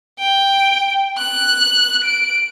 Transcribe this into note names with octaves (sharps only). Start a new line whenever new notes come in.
G5
F#6
D7